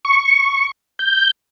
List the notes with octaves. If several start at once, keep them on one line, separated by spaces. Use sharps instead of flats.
C#6
G6